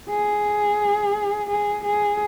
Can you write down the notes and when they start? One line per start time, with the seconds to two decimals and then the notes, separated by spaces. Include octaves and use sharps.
0.09 G#4
1.49 G#4
1.84 G#4